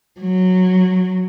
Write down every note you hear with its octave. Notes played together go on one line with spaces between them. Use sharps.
F#3